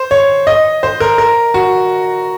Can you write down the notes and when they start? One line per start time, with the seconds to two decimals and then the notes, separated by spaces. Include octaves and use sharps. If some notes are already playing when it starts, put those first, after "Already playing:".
Already playing: C5
0.11 C#5
0.47 D#5
0.83 C5
1.00 A#4
1.18 A#4
1.54 F#4